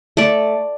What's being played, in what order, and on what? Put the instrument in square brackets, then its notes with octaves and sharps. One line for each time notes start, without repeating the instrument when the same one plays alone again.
[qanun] A3 D5